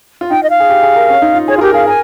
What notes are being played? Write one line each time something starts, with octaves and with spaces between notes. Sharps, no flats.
F4
D#4 G5
D#5
F5
G#4
G4
G#4
A#4
C#4
D#4
F4
G#4 C#5
F4
G4 A#4
G#4 F5
A#4 G#5